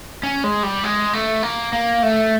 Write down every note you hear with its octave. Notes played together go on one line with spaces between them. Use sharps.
C#4
G#3
G3
G#3
A3
A#3
A#3
A3